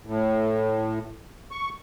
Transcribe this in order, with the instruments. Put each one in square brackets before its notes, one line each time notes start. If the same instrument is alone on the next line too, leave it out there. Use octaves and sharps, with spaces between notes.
[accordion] A2
C#6